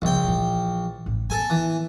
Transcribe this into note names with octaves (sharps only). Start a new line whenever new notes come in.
A#1 E2 C#3 G5
A#2 E3
A1
B3 A4 G#5
E3